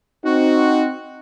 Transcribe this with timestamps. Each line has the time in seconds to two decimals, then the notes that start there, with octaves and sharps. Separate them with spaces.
0.24 C4 D#4 F#4